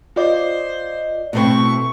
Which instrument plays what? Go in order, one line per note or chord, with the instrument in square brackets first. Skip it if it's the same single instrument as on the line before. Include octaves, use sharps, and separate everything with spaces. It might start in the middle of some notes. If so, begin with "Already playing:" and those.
[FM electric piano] F4 D5 D#5 [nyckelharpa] C5
[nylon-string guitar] B2 A3 C4 [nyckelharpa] E4 C#6